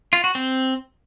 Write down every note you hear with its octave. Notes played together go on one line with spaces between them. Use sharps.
F4
F#4
C4